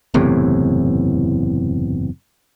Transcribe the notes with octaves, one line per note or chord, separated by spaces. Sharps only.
F#1 E2 A2 C3